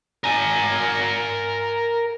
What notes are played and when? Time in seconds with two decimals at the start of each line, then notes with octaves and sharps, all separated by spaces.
0.24 A#4 G#5